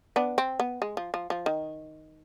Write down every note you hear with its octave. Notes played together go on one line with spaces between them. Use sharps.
B3 D4
C4
B3
G#3
F3
F3
F3
D#3